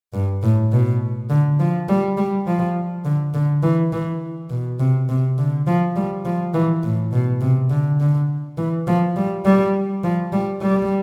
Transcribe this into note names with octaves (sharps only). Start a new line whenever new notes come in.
G2
A2
B2
D3
F3
G3
G3
F3
D3
D3
E3
E3
B2
C3
C3
D3
F3
G3
F3
E3
A2
B2
C3
D3
D3
E3
F3
G3
G3
F3
G3
G3